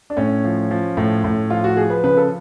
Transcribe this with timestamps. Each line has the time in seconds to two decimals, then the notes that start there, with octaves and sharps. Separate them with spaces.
0.10 D4
0.17 A2 C#4
0.44 F3
0.71 F3
0.97 A2
1.24 A2
1.50 F3 F4
1.64 F#4
1.77 F3 G#4
1.90 B4
2.04 C#3 B4
2.17 A4